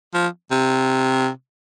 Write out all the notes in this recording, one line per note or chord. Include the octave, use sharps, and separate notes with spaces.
F3
C3